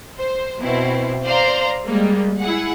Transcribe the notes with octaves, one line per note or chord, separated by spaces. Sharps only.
C5
B2 C4 E4
C5 D5 F5 A#5 C6
G3 G#3 A#3
E4 G#4 F#5